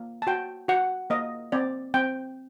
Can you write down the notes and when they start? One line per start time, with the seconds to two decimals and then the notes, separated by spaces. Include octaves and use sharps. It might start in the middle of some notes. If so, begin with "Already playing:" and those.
Already playing: A#3
0.22 A5
0.27 F#4 G5
0.68 F#4 F#5
1.10 A#3 D#5
1.52 C4 D5
1.94 C4 G5